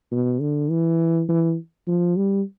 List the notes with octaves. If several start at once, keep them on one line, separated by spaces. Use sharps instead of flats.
B2
D3
E3
E3
F3
G3